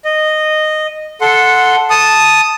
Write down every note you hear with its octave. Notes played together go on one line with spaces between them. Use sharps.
D#5
A4 F#5 C6
A5 D#6